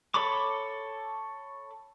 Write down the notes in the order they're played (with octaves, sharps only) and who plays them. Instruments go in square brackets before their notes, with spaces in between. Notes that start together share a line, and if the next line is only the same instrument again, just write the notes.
[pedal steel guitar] A4 C#5 B5 C#6 D6